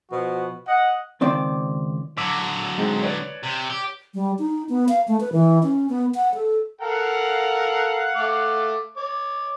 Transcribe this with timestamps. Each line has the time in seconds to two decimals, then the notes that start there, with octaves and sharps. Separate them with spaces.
0.11 B2 F3 F#4
0.68 D#5 F#5
1.21 C#2 D#3 C4 D5
2.17 D3 F#3 D6 E6 B6
2.78 G#3 C4 D#4
3.02 B4 C#5 D5
3.43 C3
3.70 G4
4.14 G3
4.39 D#4
4.69 B3
4.89 F5
5.08 A3
5.21 B4
5.33 E3
5.63 C#4
5.89 B3
6.15 F#5
6.34 A4
6.81 A4 A#4 F5 F#5 A#5
8.16 A3 D6
8.97 C#5 D6